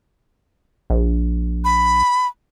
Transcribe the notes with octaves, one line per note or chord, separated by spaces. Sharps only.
A#1
B5